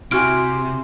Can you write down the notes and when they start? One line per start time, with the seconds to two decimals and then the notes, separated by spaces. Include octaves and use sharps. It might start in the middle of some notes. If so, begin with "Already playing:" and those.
0.11 C3 E4 F#4 G#5 C6 F6 D7